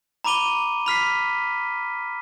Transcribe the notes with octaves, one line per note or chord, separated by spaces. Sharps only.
A#5 B5 D6 D#7 G7
B5 F6 B6 C7